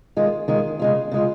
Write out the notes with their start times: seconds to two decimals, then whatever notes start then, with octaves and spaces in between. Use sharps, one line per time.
0.17 D#3 G#3 F4
0.48 D#3 G#3 F4
0.79 C#3 G#3 F4
1.11 C#3 G#3 F4